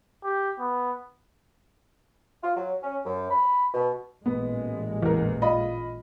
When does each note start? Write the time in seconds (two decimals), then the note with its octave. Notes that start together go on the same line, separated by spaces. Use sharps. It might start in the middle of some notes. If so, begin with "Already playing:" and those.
0.24 G4
0.59 B3
2.43 F4
2.56 F#3
2.83 C#4
3.05 F#2
3.31 B5
3.74 B2
4.26 A1 A#2 G#3 B3
5.02 E2 A#4
5.42 F4 D#5 B5